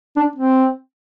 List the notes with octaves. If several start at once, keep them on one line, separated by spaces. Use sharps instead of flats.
D4
C4